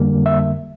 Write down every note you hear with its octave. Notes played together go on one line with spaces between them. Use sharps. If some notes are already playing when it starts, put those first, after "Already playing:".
Already playing: F2 D3 G3 A#3
E5